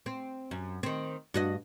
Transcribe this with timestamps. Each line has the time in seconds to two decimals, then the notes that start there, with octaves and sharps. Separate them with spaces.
0.06 C4
0.51 F#2
0.83 D#3 C4
1.34 G2 F#4 D#5